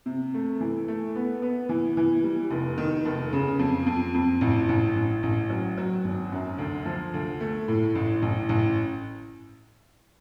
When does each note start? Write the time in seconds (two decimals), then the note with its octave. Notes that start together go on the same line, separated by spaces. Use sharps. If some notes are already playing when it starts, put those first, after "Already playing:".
0.06 C3
0.34 A3
0.60 E3
0.88 A3
1.15 B3
1.42 B3
1.69 E3
1.97 E3
2.24 G3
2.51 F1
2.78 D#3
3.05 F1
3.33 C#3
3.59 F2
3.86 F2
4.14 F2
4.41 A1
4.69 A1
4.96 A1
5.23 A1
5.50 F#3
5.77 F#3
6.04 G#1
6.32 F#2
6.58 D2
6.85 F3
7.14 D2
7.40 A3
7.68 A2
7.95 A1
8.22 A1
8.49 A1